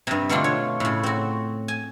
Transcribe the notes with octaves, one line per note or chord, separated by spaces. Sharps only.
G2 C3
B2 D3 A3 C4 D4 F4
C#5
A2 C#3
C4 F#4
G#5